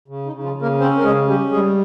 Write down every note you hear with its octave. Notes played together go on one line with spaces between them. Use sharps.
C#3
D#4
C#3
F3 F4
C#3
A#3 A#4
C4 C#4 C5
A#4
C#3 G#3 G#4
G3 C#4 G4
G3 G#3 G#4